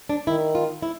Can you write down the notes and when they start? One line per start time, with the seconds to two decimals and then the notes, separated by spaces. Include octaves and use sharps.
0.09 D4
0.27 D#3 E4
0.55 F4
0.82 E4